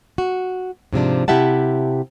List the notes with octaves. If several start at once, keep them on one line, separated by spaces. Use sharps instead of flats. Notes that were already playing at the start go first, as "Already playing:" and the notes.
F#4
G#2 C3 F3 D4
C3 E4 G4 E5 F#5 A5